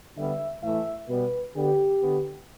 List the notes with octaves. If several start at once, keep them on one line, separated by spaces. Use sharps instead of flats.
D3 G3 B3 E5
A2 E3 A3 E5
B2 G3 B3 B4
D3 B3 G4
D3 B3